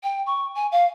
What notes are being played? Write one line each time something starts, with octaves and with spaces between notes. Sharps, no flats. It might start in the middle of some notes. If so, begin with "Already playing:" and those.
G5
C#6
G#5
F5